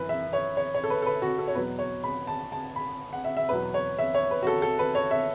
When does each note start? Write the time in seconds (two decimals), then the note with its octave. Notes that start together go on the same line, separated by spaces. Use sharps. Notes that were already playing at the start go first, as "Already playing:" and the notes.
Already playing: F#2 E3 B4
0.09 E5
0.33 C#5
0.57 C#5
0.74 C#5
0.84 A4
0.90 B4
1.02 A4
1.06 B4
1.22 F#4
1.38 A4
1.48 C#5
1.54 E2 B2 F#3 B4
1.79 C#5
2.04 B5
2.27 A5
2.52 A5
2.76 B5
3.13 F#5
3.25 E5
3.37 E5
3.49 E2 B2 F#3 B4
3.74 C#5
3.98 E5
4.15 C#5
4.31 B4
4.43 F#4
4.47 A4
4.62 A4
4.79 B4
4.95 C#5
5.11 E5